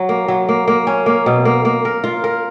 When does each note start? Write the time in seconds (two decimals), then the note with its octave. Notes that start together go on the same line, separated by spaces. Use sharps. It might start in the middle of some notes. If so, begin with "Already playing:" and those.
Already playing: F#3
0.09 A#3
0.28 F#3
0.49 A#3
0.68 A#3
0.87 C#4
1.06 A#3
1.26 B2
1.45 A#3
1.65 A#3
1.85 A#4
2.04 F4
2.24 A#4